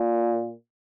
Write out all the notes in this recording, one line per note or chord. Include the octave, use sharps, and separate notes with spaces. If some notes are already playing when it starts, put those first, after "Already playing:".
Already playing: A#2